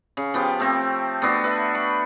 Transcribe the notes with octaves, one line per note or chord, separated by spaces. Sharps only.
C#3
F3 B3 G4
A3 C4
A3 B3 D4 F#4
B4 E5
B5